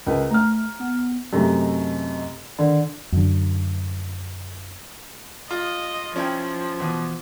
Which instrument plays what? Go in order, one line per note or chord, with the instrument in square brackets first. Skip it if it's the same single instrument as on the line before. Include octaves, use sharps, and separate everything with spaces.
[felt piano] C#2 A#4 B4
[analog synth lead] A3 [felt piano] A#5 F6
[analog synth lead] B3
[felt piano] F#2 C3 A3 [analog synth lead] D#5
[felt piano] D3 [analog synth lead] D#3
[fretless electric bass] F#2 D3
[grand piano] F4 [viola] D#5
[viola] F3 [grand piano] C#4 E4 G5
[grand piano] B2 E3